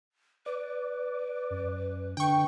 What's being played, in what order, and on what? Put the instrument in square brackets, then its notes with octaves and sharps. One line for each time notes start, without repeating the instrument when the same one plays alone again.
[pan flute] B4 [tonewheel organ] D5
[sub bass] F#2
[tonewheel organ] D3 [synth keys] G5 C#6